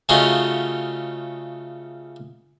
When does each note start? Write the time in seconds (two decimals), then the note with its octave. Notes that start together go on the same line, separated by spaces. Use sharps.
0.09 C#3 A3 C#4 D#4 F4 F#4